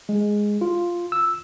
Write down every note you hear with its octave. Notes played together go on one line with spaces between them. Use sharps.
G#3
F4
E6